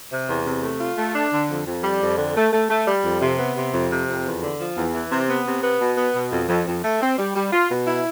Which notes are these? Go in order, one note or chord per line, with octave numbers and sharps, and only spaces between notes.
C3
E2
C3
A3
F4
A3
D4
D3
F2
F2
G3
F2
D3
A3
A3
A3
G3
F2
C3
B3
C3
F2
C3
F2
E2
D3
F3
E2
E3
C3
B3
C3
B3
B2
B3
B2
F2
F2
F2
A3
C4
G3
G3
F4
B2
E4